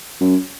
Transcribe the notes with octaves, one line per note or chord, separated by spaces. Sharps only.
F#2